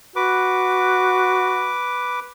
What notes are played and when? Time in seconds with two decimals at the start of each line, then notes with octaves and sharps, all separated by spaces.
0.16 F#4 B4 D6